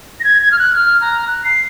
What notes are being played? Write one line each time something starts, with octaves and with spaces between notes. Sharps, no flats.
A#6
G#6
G#6
F6
F#6
F6
A#5
F#6
C7